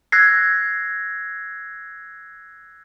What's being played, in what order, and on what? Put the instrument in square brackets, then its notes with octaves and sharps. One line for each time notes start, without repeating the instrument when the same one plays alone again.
[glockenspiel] E6 F#6 G#6 A#6 C7